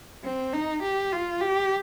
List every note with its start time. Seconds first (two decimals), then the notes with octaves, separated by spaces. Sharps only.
0.24 C4
0.53 D#4
0.83 G4
1.12 F4
1.41 G4